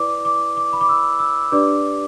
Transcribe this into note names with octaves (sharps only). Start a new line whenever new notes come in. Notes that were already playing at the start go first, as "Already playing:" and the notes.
Already playing: E4 B4 D5 D6
D6
D6
B5
D6
E6
E6
D4 G4 B4 D5 D6